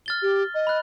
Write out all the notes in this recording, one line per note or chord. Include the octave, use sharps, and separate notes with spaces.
F6 A6 G7
G4
D#5
B5 F#6